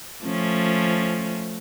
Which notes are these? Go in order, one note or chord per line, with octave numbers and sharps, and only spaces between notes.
F3 A3 C#4